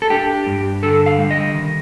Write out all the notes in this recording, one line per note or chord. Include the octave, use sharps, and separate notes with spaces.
A4
D4 G4
G2
D3 A4
F5
G3
D#5
D#3